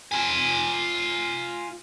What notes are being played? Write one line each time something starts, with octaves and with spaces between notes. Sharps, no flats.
F4 G#5